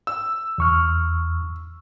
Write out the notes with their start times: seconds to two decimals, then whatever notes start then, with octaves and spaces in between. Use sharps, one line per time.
0.07 E6
0.58 E2 C#6 F6